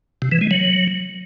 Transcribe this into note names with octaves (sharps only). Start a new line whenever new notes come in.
C3
E3
G#3
F#3